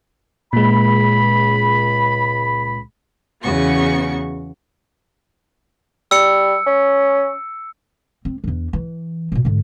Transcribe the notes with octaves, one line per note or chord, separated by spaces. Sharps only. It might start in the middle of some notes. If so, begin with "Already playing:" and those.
C#2 A#2 G#3 B5
E2 C#3 B3 F#4 C#6
G3 E6 C#7
C#4
C4
E2 D4
E3
A1 A#2
G#2 D3